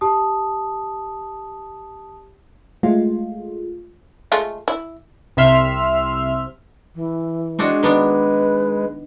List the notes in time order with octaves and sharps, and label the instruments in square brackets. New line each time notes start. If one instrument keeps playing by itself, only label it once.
[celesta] G4 A5 D#6
[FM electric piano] G#3 A3 F4
[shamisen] G#3 A3 F4
E4
[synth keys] C2 C3 E5 C6 F6
[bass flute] E3
[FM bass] G#3 [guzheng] C4 D4 F#4
[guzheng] D#3 B3 D4 [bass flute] B4